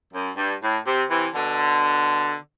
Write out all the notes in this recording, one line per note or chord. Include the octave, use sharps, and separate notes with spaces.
F#2
G2
A2
C3
C3 E3
B2 D3